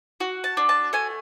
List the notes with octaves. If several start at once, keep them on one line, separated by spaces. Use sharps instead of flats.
F#4
A5
D4
A5
A3 G#5